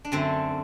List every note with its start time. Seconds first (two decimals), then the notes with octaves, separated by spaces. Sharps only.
0.05 D4
0.12 F#2 D3 A3 C4